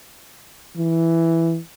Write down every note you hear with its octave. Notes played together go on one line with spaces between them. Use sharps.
E3